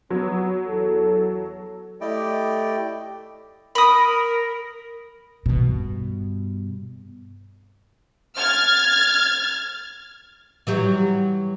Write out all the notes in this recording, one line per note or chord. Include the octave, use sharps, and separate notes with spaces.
F#3 B3
E2 A4
A3 E4 G4 D5 D#5 G5
A#4 B5 D#6
G2 B2
F6 G#6 A6
E3 F#3 G3